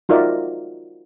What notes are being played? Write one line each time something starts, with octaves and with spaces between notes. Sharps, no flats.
D#4 F4 F#4 A#4 D5 E5